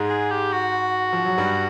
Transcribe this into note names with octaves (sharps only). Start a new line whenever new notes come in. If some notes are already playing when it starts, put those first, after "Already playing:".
Already playing: G#2 G#3
G#4
G4
F#4
F3
F#3
G2 G3